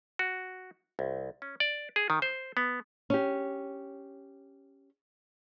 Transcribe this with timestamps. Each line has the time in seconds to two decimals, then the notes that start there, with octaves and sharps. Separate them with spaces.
0.19 F#4
0.99 C2
1.42 C#4
1.60 D5
1.96 G#4
2.10 D#3
2.22 C5
2.57 B3
3.10 C#4 G4